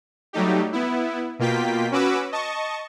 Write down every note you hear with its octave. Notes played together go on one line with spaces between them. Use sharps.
F#3 G3 A3 D#4 G4
B3 E4
B2 A#3 F4 G5 B6
C#4 F#4 B4 D6 E6
D#5 A5 C#6